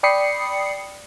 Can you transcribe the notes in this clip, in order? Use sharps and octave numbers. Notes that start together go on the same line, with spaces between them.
D5 G5 B5 D#6 C7 C#7